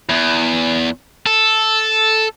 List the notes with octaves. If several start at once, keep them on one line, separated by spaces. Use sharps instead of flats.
E2
A4